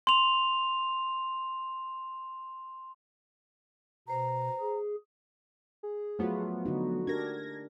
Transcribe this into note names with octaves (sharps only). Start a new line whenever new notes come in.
C6 F7
B2 B4 C5 A#5
G#4
G#4
F3 F#3 A3 B3 F4 F#4
D3 D#4 F#4
D4 G4 A#4 G#6 A#6